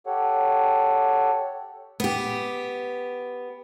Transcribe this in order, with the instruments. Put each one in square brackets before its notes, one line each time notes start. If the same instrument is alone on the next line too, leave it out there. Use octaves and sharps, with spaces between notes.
[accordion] G4 A4 C#5 F#5
[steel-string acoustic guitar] B3 G4